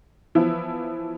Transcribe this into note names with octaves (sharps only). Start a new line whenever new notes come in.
E3 F3 B3 E4